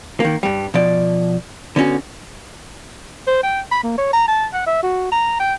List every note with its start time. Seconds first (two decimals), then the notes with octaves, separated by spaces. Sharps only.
0.20 D#3 A#3
0.43 G2 G3
0.74 B2 F3 D5
1.76 D3 B3 C#4 F#4
3.27 C5
3.43 G5
3.71 B5
3.83 A#3
3.98 C#5
4.13 A#5
4.28 A5
4.53 F#5
4.66 E5
4.83 F#4
5.12 A#5
5.39 G5